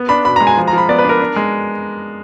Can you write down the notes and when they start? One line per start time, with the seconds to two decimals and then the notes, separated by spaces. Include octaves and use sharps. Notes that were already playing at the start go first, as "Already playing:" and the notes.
Already playing: B3
0.09 D4 B5
0.25 B2 B5
0.36 A#5
0.40 G#3
0.47 G#5
0.57 F3
0.68 A#5
0.73 F3 B5
0.89 B3 D5
0.99 B4
1.04 D4
1.09 A#4
1.21 D4
1.36 G#3